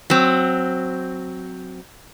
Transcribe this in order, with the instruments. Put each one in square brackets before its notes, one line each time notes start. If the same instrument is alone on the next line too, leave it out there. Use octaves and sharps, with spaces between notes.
[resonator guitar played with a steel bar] F#3 C4